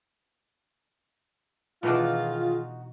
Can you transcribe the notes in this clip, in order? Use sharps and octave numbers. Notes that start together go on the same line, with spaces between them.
B2 D#3 E3 G#3 D4 D#4 F4 F#4